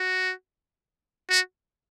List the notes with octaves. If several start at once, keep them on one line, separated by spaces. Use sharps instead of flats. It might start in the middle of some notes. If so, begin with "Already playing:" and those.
Already playing: F#4
F#4